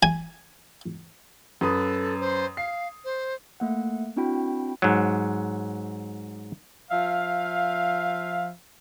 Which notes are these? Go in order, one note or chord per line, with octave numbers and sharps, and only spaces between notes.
G#5
F#2 A4 B4 D#6
C5
F5 C7
C5
A3 A#3 F#5
C4 D4 E4 F#4 G5 B5
G#2 F#3
F3 E5 F5